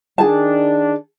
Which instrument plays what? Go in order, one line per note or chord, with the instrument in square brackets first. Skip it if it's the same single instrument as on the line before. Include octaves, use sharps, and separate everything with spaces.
[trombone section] D#3 D4 [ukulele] G#4 A5